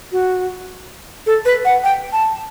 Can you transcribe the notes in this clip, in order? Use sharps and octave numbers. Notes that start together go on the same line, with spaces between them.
F#4
A4
B4
F#5
G5
A5